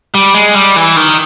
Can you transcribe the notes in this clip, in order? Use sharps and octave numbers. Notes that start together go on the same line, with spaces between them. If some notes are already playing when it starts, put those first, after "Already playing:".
G3
G#3
G3
E3
D#3